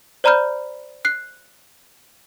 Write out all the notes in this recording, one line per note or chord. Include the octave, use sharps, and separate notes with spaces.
C5 D5 A#5 B5 F6 G6
F#6 C7